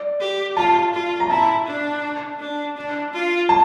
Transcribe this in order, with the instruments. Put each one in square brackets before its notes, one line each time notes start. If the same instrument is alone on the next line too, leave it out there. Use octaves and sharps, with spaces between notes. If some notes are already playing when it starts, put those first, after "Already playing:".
Already playing: [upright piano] D5
[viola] G4
[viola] F4 [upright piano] A5
[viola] F4
[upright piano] A#5
[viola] E4 [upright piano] A5
[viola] D4
D4
D4
F4
[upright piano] A5